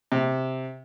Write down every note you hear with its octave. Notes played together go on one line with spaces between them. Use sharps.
C3